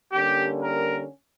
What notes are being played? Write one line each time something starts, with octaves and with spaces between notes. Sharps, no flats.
D3 G3 A#3 C#4 G4
A#4